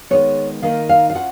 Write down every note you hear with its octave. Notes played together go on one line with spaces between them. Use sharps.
D#3 G#3 B3 C#5
D#3 A#3 D#4 F5
F5
F5
C#4 F4 F#5